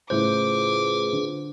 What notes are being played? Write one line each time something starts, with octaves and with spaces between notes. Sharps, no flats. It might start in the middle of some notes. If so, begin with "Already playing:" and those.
A2 C#3 F4 G#4 B4 C5 D6 G6
D3